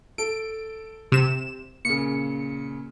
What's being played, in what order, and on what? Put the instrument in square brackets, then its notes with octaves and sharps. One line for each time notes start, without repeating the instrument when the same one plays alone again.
[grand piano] A4 [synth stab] D7
[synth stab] C3 E7
[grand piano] A#2 C#3 [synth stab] C#7